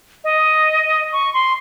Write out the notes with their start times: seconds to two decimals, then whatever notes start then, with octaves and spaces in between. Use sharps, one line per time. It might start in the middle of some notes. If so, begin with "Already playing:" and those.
0.24 D#5
1.13 C#6
1.34 C6